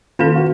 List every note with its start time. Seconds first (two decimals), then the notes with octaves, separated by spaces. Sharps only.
0.19 D#3 A#3 C#4 F4 A4
0.36 F#4